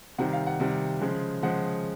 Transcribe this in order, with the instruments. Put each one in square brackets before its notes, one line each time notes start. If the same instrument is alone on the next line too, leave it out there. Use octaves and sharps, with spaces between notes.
[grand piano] C3 D#3 G3 F#5
F5
F#5
C3 D#3 G3
C#3 F3 G#3
C#3 F3 G#3 F#5